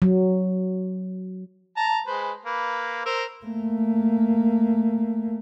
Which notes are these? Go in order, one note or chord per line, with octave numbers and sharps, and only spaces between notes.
F#3
A5 A#5
G#3 B4 C5
A#3 B4
A#4 C5 E6
A3 A#3